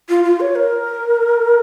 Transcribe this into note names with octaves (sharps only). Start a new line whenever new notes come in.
F4
F4
C#5
A#4